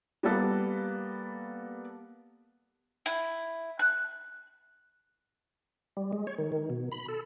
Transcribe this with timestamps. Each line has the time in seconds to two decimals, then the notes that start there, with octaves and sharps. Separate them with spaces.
0.23 G3 A#3 B3 A4
3.06 E4
3.79 F#6
5.97 G3
6.13 G#3
6.27 C#5
6.38 D#3
6.52 D#3
6.70 B2
6.92 B5
7.08 A4